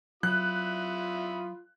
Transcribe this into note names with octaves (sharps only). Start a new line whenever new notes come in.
F#3 E4 F4 B5 D#6 F#6